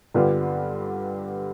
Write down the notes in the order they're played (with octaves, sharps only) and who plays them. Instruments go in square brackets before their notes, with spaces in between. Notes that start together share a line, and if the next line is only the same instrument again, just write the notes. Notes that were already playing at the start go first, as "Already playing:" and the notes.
[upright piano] G2 D3 G3 B3 F4